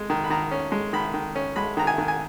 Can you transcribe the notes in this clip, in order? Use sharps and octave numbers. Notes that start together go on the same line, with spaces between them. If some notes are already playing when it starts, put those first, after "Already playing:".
Already playing: G#3
D#3
B5
D#3 A#5
C#4
G#3
D#3 B5
D#3
C#4
G#3 B5
D#3 A#5
G#5
D#3
G#5